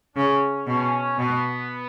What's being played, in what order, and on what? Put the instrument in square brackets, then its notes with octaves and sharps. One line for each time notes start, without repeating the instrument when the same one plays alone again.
[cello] C#3 [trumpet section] C#4
[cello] B2 [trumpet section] C#4
[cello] B2 [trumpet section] B3